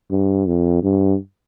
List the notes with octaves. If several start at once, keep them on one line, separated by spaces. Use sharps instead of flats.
G2
F2
G2